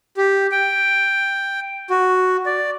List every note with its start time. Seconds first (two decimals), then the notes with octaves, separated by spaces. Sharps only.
0.17 G4
0.52 G5
1.90 F#4
2.46 D5